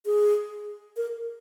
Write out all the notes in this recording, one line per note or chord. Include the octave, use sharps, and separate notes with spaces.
G#4
A#4